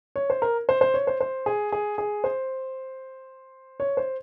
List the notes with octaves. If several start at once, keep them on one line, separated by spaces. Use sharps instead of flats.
C#5
C5
A#4
C5
C5
C#5
C5
C5
G#4
G#4
G#4
C5
C#5
C5